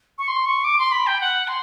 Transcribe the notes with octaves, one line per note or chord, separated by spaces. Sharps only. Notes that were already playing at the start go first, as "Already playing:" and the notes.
C#6
C6
C#6
D6
C6
B5
G5
F#5
C6